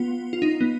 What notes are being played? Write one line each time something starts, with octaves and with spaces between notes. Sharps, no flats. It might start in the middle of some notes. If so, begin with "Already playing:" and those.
Already playing: B3 F4
F4
D#4
B3